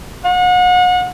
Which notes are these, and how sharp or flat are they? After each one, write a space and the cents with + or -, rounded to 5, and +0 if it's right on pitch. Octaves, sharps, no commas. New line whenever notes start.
F#5 -35